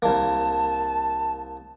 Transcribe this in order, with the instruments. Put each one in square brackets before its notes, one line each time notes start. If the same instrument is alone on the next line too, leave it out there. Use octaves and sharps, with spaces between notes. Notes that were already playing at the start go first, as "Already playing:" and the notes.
[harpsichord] C2 A#3 [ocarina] A5